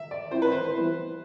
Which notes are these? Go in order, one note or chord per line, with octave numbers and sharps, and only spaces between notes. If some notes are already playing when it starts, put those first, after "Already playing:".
Already playing: E5
D5
F3 C4 E4 C5
B4
C5
E3 G3 B3 E4